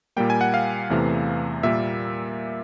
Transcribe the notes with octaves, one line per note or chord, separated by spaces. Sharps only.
A#2 G3 A#3 G5
G#5
F#5
F5
E2 C3 E3 A3
A#2 G3 A#3 E5